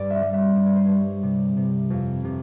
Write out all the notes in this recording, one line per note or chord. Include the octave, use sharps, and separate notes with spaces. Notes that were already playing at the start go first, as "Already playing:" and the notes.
Already playing: G2 D5
E5
G3
E5
G2 D5
C#5
C5
G3 C#5
C3
C3
F2
C3